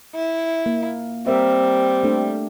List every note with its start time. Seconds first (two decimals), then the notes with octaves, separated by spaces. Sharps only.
0.15 E4
0.66 A#3
1.27 G3 C4 A#4 E5
2.03 A3 D4